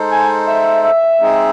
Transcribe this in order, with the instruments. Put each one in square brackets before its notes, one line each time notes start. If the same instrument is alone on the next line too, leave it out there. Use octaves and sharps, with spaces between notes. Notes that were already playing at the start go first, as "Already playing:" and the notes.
Already playing: [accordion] G#3 D#4 A4 C5
[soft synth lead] G#5
E5
E5
[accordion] G#3 C4 D#4 G#4